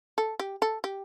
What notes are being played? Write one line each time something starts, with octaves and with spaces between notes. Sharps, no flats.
A4
G4
A4
G4